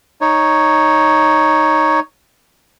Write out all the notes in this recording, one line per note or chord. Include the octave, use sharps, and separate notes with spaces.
D#4 C#5